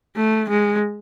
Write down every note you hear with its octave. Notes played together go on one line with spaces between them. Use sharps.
A3
G#3